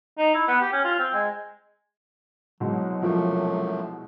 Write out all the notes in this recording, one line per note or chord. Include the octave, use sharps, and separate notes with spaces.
D#4
E4
B3
G4
C#4
F4
C4
G#3
C2 B2 F#3 G#3
F#2 C3 F3 A3